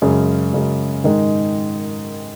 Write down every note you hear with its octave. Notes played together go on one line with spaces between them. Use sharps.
F#2 C#3 G#3 C#4
F#2 C#3 G#3 C#4
G#2 D#3 G#3 D#4